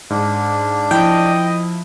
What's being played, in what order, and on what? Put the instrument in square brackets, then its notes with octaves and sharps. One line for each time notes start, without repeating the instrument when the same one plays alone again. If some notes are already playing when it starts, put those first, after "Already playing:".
[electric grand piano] G#2 [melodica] D4
[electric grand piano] F3 E4 [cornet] D#5 [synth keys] G5